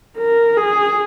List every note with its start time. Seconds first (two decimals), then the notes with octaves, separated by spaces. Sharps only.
0.18 A#4
0.57 G#4